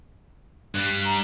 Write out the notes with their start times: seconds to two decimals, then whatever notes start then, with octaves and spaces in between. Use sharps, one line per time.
0.75 G2 G3 F#6
1.05 A#5